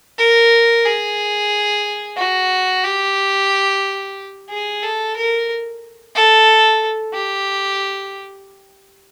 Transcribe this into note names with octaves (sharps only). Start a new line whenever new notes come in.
A#4
G#4
F#4
G4
G#4
A4
A#4
A4
G4